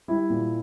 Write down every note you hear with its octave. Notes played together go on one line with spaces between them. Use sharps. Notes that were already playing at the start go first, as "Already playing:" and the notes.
G3 E4
A#2